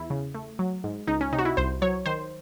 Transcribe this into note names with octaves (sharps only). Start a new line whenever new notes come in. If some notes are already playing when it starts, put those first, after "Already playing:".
Already playing: E2 E4
C#3
A3
F#3
G#2
C#2 D#4
C#4
C3 D#4
F#4
E4
C2 C5
F#3 C#5
D#3 C5